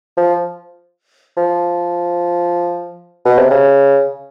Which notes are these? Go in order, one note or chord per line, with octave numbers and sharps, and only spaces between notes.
F3
F3
B2
C3
C#3